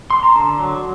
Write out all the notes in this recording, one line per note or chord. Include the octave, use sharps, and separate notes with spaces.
C6
A#5
D3 A5
F#3